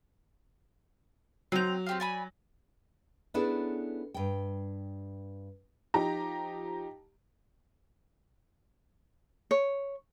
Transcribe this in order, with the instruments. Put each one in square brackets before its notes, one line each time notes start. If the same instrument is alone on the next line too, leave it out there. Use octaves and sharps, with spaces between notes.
[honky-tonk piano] F#3 F7 [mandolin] C4 G6
[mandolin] C4 G4 F5
D5 G#5 B5
[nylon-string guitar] B3 C#4 D4 E4 G#4 A4
G2 G5
[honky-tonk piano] F3 D#4 G4 A#5
[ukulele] C#5